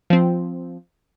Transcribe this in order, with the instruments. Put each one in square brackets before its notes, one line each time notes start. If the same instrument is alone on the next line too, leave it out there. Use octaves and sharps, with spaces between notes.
[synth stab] F3 C4